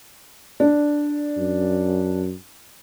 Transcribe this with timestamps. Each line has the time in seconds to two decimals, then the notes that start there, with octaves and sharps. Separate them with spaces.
0.60 D4
1.37 F#2